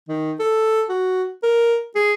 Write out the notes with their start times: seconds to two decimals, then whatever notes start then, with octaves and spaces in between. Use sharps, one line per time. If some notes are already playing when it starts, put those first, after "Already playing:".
0.09 D#3
0.40 A4
0.89 F#4
1.43 A#4
1.96 G#4